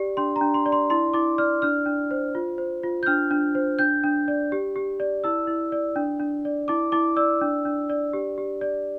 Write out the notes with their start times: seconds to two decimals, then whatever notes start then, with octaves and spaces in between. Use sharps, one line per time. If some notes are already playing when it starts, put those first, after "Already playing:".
Already playing: G4 D5
0.17 D4 C6
0.36 A#5
0.41 D4
0.54 C6
0.66 D5
0.72 C6
0.90 E4 C6
1.14 E4 D6
1.38 D5 F6
1.62 D4 F6
1.86 D4
2.11 C5
2.35 F4
2.58 C5
2.83 F4
3.03 G6
3.06 D4 F6
3.31 D4
3.55 C5
3.79 D4 G6
4.04 D4
4.28 D5
4.52 G4
4.76 G4
5.00 D5
5.24 E4 E6
5.47 E4
5.72 D5
5.96 D4
6.20 D4
6.45 D5
6.68 E4 D6
6.92 E4 D6
7.16 D5 E6
7.41 D4
7.65 D4
7.90 D5
8.13 G4
8.38 G4
8.61 D5